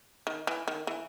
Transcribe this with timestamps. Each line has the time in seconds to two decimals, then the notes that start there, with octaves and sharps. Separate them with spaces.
0.27 D#3
0.47 E3
0.68 D#3
0.87 E3